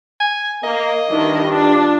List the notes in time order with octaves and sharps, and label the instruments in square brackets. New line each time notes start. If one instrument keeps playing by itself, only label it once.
[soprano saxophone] G#5
[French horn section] A#3 [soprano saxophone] D#5
[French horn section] G2 [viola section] D#3 D4 E4
[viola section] D4 F4